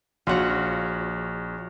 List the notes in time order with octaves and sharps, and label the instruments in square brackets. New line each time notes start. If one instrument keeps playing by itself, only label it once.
[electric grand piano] A#1 C#5 [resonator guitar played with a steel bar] F4 F#4